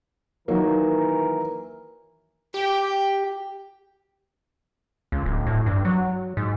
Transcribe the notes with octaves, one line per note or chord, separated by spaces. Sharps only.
D#3 E3 F#3 A#3 A#4
G4 G5
C#2
D1
A2
G2
F#3
G#2